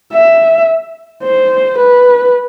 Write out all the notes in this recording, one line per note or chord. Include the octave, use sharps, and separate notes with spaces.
E5
C5
B4